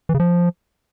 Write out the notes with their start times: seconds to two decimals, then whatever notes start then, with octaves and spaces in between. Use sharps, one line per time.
0.09 E3
0.14 C#3
0.20 F3